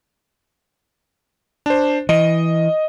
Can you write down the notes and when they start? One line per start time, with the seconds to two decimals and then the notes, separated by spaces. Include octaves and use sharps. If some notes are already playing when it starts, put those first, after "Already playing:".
1.66 D4 C5
2.09 E3 D#5